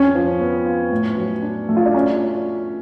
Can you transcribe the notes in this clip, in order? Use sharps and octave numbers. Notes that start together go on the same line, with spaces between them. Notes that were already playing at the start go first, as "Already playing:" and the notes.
Already playing: F2 C#4
F3
B3
F4
A2
F#3
D4
A3
F4
D4
C#4